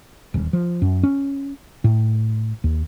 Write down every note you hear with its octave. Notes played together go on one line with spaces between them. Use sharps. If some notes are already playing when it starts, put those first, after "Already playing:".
D#1
F3
F#2
C#4
A2
D#2